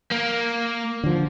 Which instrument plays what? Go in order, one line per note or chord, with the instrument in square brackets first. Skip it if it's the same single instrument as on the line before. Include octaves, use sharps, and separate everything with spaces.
[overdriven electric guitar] A#3
[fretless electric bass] D3 F3